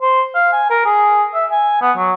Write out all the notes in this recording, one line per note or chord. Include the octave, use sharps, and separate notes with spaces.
C5
F5
G#5
A#4
G#4
E5
G#5
B3
F#3